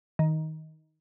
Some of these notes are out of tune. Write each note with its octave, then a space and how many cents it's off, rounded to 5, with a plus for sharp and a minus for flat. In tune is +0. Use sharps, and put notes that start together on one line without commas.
D#3 +15